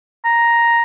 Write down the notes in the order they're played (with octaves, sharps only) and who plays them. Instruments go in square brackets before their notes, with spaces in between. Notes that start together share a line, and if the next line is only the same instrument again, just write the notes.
[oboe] A#5